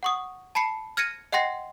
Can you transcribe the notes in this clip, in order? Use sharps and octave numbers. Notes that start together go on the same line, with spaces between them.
F#5 C#6 D#6
A5 B5 C7 C#7
F6 G#6 A#6 C#7 D#7
D#5 F#5 G5 C6 A#6 C7